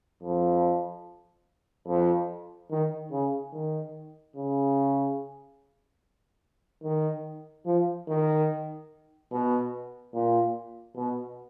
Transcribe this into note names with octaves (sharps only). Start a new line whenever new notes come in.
F2
F2
D#3
C#3
D#3
C#3
D#3
F3
D#3
B2
A#2
B2